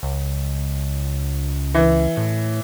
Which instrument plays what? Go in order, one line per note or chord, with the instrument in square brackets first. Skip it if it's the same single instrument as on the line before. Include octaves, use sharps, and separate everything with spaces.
[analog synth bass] C#2
[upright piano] E3
[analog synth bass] A2